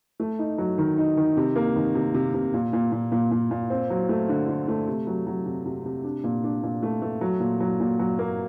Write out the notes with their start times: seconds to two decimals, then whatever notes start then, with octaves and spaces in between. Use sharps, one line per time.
0.20 A3
0.39 D#4
0.58 F#3
0.78 D#3
0.98 D#4
1.17 D#3
1.37 C3
1.56 A#3
1.75 D#3
1.95 C3
2.14 C3
2.34 C3
2.54 A#2
2.73 A#2
2.92 A#2
3.12 A#2
3.31 A#2
3.51 A#2
3.70 C4
3.90 F#3
4.09 A3
4.29 D3
4.48 D3
4.68 A3
4.88 C3
5.07 F#3
5.27 F#3
5.46 C3
5.66 C3
5.85 C3
6.04 D4
6.24 A#2
6.44 D4
6.63 A#2
6.83 A3
7.02 A3
7.21 F#3
7.40 A#2
7.60 F#3
7.80 A#2
7.99 F#3
8.19 A#3